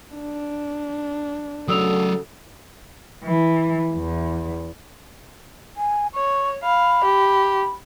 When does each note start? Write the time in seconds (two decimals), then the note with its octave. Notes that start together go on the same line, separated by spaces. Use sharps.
0.14 D4
1.68 C#3 F#3 F#4 A4 D5 D#6 E6 F7
3.24 E3
3.94 E2
5.77 G#5
6.14 C#5 C#6
6.64 F5 B5
7.05 G4